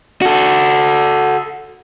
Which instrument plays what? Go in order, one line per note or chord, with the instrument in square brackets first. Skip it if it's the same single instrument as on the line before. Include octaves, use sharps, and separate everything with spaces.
[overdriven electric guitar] F#4 A4